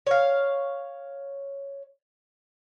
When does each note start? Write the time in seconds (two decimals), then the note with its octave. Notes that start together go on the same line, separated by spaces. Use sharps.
0.07 C#5 F5